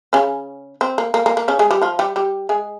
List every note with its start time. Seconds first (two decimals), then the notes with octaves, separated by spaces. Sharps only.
0.13 C#3 C#4
0.81 C4
0.98 A#3
1.14 A#3
1.26 A#3
1.37 A#3
1.48 C#3 C#4
1.59 G#3 G#4
1.71 G3 G4
1.82 F3 F4
1.99 G3 G4
2.16 G3 G4
2.49 G#3 G#4